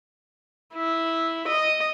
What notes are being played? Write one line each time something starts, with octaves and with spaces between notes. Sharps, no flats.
E4
D#5